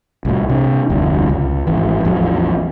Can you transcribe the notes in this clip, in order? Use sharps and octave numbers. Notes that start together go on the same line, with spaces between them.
C2 A2
C3 D4
F1 D2 G2
C#2
G#1 E3
A1 E2 F3 F#3